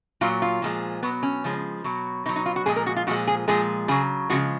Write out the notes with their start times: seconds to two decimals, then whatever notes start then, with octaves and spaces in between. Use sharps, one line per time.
0.21 A#2 F#3 F4
0.42 F4
0.62 A#2 F3 G#3
1.03 B2 F#3 B3
1.23 C#4
1.44 C#3 F3 G#3
1.84 B2 F#3
2.26 B2 D#4
2.29 F#3
2.36 D#4
2.46 F4
2.56 F#4
2.66 A#2 F3 G#3 G#4
2.76 A#4
2.87 F#4
2.96 F4
3.07 A#2 F3 G#3 F#4
3.28 G#4
3.48 A#2 F3 G#3 G#4
3.88 C#3 F#3 G#4
4.30 C#3 F3 G#3 F#4